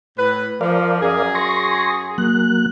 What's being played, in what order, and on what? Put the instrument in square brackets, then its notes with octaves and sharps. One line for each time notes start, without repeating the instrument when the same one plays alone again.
[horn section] A2 B4
[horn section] F3 [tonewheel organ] A#4 D5 F5
[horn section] F#2 G#4
[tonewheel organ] C6 C#6 A#6
F#3 A#3 F#6